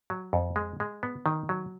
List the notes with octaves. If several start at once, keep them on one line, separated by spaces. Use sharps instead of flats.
F#3
F2
G#3
G#3
B3
D#3
F#3